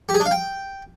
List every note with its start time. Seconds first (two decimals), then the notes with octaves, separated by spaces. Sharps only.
0.09 G4
0.14 G#4
0.20 D4
0.26 F5
0.31 G5